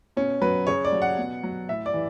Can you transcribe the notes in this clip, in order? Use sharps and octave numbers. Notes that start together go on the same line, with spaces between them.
B2 C#4
F#3 B4
C#3 C#5
D5
F#3
F#5
B2
F#3
A2 E5
D5
E3